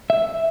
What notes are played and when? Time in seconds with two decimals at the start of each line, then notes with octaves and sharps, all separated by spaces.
0.10 E5